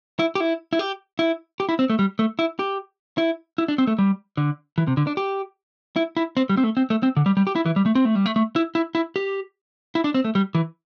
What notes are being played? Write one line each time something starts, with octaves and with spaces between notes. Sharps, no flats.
E4
G4
E4
E4
G4
E4
G4
E4
C4
A3
G3
A3
E4
G4
E4
E4
D4
C4
A3
G3
D3
E3
C3
D3
D4
G4
E4
E4
C4
G3
C4
A3
C4
A3
C4
D3
G3
G3
G4
E4
E3
G3
A3
C4
A3
G3
A3
A3
E4
E4
E4
G4
E4
D4
C4
A3
G3
E3